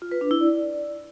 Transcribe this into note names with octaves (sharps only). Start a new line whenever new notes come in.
F4
B4
D4
E4
D5